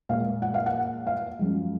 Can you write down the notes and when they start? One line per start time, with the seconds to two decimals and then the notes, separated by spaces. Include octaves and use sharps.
0.09 A#2 G#3 F5
0.42 F#5
0.54 F5
0.66 F#5
1.07 F5
1.39 F#2 F3 G#3